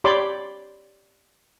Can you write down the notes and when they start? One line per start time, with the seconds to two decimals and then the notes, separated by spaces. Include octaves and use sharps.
0.04 G4 C#5 D5 B5 C6 D6